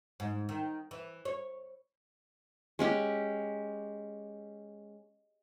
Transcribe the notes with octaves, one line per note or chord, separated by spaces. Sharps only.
G#2
D#3
E3
C#5
G#3 C#4 G4